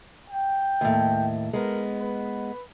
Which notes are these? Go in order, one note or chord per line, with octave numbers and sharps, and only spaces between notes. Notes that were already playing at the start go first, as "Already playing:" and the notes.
G5
D#2 A2
G#3 B3 A#4
B4